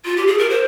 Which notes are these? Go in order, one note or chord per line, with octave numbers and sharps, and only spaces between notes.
F4
G4
G#4
A#4
C5